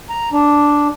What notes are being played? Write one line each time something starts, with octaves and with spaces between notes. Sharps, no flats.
A#5
D4